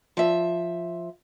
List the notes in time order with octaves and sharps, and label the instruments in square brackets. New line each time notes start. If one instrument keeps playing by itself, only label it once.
[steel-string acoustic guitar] F3 E5